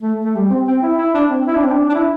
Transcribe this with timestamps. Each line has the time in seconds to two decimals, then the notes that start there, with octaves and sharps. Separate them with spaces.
0.02 A3
0.24 A3
0.35 G3
0.50 C4
0.67 C4
0.83 E4
0.99 E4
1.14 D4
1.30 C4
1.47 E4
1.55 D4
1.64 C4
1.72 D4
1.89 D4
1.95 E4